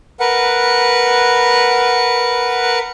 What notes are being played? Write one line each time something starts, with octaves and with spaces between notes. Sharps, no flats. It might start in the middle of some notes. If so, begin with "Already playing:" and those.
A#4 B4 F#5